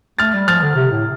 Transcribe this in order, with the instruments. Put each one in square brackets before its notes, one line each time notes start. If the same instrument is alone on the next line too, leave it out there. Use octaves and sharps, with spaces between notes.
[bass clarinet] A3 [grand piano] F6 A6
[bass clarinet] G3
[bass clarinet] F3 [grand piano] F6 A6
[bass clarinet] D3
C3
A2